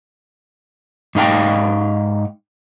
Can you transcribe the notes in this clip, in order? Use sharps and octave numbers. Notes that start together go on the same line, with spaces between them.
G#2 D#4 F5 G5